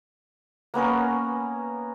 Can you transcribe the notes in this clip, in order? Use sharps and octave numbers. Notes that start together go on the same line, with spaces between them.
A#3 B3 C#4 A#4